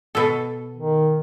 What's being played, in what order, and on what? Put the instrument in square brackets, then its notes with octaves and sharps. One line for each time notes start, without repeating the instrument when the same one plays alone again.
[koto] B2 A4
[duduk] D#3